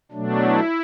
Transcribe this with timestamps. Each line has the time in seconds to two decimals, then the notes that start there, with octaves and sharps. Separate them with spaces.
0.12 B2 F#3 A3 D4
0.42 E4